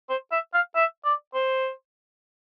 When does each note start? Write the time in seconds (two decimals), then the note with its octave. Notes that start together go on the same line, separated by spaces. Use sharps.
0.09 C5
0.32 E5
0.54 F5
0.75 E5
1.05 D5
1.34 C5